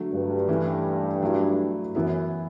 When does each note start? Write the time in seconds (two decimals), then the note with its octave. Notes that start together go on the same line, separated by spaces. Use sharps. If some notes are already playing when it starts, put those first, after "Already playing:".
Already playing: D3 F#3 A3
0.12 G2
0.48 E3 A3 C#4 E4
1.22 F#3 A3 E4
1.95 F#2 E3 B3 E4